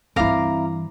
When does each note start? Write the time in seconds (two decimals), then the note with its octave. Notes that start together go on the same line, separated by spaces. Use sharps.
0.16 G2 E3 C4 E4 F5 A#5 D6